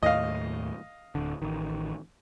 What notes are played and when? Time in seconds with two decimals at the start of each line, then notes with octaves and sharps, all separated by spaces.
0.03 D#2 A2 D#5 F5
1.15 D1 D3
1.42 A1 D#3